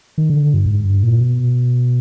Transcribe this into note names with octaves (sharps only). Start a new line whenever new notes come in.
D#3
D3
G2
G#2
G2
A#2
B2